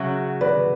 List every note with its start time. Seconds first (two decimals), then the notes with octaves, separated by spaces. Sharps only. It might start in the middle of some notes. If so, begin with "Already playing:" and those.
Already playing: C#3 F#3 C#4 F#4 E5
0.41 B4 D5